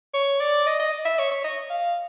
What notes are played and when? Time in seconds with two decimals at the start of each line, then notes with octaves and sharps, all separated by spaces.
0.14 C#5
0.40 D5
0.66 D#5
0.79 D#5
1.05 E5
1.19 C#5
1.31 C#5
1.44 D#5
1.70 F5